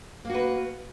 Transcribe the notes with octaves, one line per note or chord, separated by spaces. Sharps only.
A#3 F#4 B4